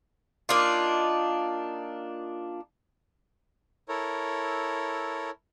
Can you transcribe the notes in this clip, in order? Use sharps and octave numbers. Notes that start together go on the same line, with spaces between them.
A#3 D4 D#4 F4
E4 A4 A#4 C#5